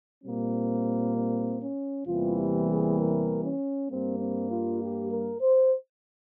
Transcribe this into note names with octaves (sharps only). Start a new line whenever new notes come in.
A#2 G3 A#3 C4
C4
C#4
E2 C3 E3 G3 A#3 F4
G4
G#4
A#4
C#4
G2 G3 A#3 C4
C4
F4
G4
A#4
C5